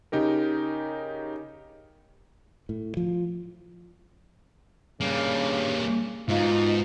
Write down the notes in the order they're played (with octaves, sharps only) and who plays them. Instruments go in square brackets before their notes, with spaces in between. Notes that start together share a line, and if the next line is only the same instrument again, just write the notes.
[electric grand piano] C#3 D#4 G4 A#4
[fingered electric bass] A2
F3
[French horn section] G2 C#3 [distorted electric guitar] G3 A#3
[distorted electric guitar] G#2 [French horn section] B2 D#4 F4